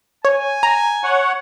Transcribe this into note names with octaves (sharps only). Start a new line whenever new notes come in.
C#5 G#5
A#5
C#5 F#5